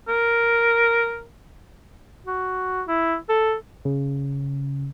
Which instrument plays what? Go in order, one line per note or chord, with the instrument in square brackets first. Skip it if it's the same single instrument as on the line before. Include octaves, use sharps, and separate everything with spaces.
[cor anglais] A#4
[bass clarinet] F#4
E4
A4
[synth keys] C#3